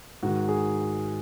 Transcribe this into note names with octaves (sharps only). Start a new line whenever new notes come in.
G#2 D#3 F#4
G#4